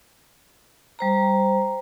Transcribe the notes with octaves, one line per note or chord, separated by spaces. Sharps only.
G3 C5 A#5